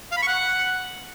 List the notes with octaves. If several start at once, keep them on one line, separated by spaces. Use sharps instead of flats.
F5
B5
C#6
F#5